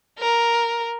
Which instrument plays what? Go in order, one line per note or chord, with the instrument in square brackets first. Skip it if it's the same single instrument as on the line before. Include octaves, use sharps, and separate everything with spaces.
[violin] A#4